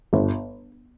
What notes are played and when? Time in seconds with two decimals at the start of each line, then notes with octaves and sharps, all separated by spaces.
0.13 G1